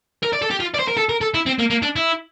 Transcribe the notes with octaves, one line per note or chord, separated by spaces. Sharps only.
A#4
D5
A4
G4
F4
D5
C5
A#4
A4
A#4
A4
E4
C4
A#3
A#3
D4
E4